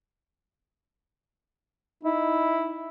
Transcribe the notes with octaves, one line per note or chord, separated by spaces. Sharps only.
D#4 E4